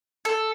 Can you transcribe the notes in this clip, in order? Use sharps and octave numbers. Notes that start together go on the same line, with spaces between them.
A4